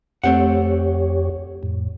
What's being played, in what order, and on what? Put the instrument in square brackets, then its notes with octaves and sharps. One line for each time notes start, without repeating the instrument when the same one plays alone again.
[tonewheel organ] F2 G4 C#5 [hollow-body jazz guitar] A3 C4 F#5
[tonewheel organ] F2 A2